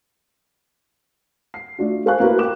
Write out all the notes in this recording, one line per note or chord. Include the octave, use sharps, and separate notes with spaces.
C7
A3 D4 F4 F#4
A4 C5 F5 G#5 C#6 F#6
A#3 E4 F#4 B4
G5 D6 F#6 E7